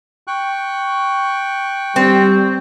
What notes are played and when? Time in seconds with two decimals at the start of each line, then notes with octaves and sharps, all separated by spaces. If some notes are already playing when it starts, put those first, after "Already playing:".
0.27 G5 C#6 F#6
1.96 G3 C4